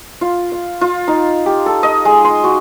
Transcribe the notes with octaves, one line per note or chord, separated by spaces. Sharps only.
F4
F5
F4
D#4
G4
A4
D#5
G#3
C6
F#4